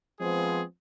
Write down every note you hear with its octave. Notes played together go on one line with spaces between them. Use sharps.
F3 G#3 B3 C4 G#4